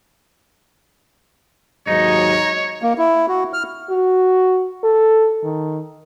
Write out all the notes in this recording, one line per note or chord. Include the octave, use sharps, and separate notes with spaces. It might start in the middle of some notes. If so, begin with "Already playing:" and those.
D#2 G#2 F#3 D#4 C#5 D#5
A#3
E4
F#4
F6
F#4
A4
D#3